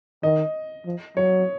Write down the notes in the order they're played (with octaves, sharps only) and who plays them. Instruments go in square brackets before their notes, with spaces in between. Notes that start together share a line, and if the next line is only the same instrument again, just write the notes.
[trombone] D#3 [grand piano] D#5
[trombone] F3
[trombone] F#3 [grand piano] C#5